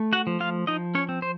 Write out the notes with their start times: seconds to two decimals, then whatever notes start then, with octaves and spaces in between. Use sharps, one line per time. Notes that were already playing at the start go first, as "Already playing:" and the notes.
Already playing: A3
0.13 F#4 F#5
0.27 F3
0.40 F4 F5
0.67 F3 D#4 D#5
0.95 C#4 C#5
1.09 C4
1.22 C5